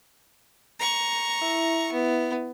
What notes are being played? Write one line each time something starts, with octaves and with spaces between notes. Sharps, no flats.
A#5 C#6
E4 E5
B3